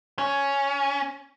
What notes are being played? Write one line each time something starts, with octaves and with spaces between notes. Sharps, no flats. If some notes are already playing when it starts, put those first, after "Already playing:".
C#4